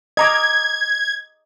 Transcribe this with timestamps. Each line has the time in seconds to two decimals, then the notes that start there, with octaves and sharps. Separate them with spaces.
0.17 D#5 A#5 D6 G#6